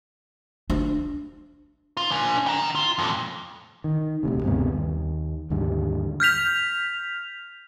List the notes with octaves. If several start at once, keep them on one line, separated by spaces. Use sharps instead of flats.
D4
F4
D4 G#5
G5 A#5
F4
F2 A#2
D#3
D#1 D2 C3
D2 G2 C3 B3
D#2
D#2 G#2 D3 G3
F6 G6 B6 F7